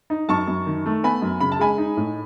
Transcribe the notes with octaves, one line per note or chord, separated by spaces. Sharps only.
D#4
F#2 A5 C#6
F#2
D#3
A3
B3 G#5 B5
F#2
C#3 B5
A5
G#3 G#5 B5
D#4
A2